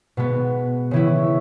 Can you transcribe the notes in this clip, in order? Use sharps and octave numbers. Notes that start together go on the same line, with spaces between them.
B2 G#3 B3
C#3 E3 C#4 E4